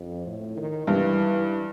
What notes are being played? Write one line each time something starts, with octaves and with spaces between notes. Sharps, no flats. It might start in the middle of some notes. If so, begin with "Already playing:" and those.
Already playing: F2
A2
D#3
G2 E3